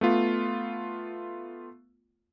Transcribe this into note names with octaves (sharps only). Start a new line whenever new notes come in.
A3 B3 F4